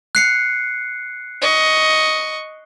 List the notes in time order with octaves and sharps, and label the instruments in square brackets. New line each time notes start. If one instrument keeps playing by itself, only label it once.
[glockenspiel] F#6 C7 C#7
[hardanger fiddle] D#5 C#6